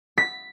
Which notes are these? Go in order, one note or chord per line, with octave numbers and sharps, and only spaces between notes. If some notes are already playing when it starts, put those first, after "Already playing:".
B6